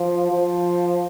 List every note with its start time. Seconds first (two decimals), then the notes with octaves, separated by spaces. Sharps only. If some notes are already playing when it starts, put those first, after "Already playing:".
Already playing: F3
0.31 F3